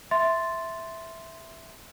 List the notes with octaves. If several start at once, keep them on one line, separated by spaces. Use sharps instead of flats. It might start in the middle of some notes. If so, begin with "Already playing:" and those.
E5 C6 A6